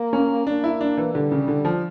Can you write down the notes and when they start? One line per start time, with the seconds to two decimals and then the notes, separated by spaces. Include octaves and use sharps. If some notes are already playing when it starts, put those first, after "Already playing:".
Already playing: A#3
0.13 C#4
0.47 A#3 D4
0.64 E4
0.81 D4
0.97 E3
1.14 D3 G3
1.32 C#3
1.48 D3
1.65 F3